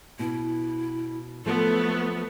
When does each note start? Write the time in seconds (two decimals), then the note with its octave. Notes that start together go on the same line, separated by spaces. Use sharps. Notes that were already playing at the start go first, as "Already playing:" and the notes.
0.19 B2 E4
1.45 F3 F#3 A3 B3 A4